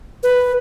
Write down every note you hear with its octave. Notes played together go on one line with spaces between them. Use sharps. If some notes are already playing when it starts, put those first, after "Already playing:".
B4